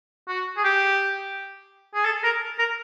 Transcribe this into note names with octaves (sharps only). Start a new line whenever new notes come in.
F#4
G#4
G4
G#4
A4
A#4
A#4